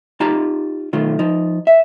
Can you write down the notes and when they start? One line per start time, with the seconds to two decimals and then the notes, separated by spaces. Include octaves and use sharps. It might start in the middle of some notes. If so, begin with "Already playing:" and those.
0.20 D#4 F4 G4 A5 A#5
0.93 B1 D#3 A3 F4
1.19 F3 D#4
1.67 E5